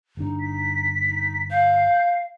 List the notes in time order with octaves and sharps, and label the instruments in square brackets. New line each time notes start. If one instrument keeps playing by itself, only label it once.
[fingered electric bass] G1 D4 [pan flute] D#4
[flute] B6
[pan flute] D#4
[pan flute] F5 [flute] G6